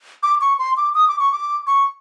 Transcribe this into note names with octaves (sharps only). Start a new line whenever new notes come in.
D6
C#6
C6
D6
D#6
D6
C#6
D6
C#6